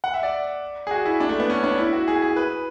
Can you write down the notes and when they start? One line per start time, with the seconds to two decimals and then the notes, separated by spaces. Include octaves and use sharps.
0.04 F#5
0.14 E5
0.23 D5
0.87 G#4
0.91 F#4
1.05 E4
1.20 D4
1.29 A3
1.40 B3
1.50 C#4
1.64 D4
1.78 E4
1.93 F#4
2.08 G#4
2.22 G#4
2.36 B4